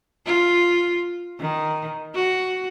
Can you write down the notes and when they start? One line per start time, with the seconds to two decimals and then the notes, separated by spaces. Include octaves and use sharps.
0.26 F4
1.40 D#3
2.15 F#4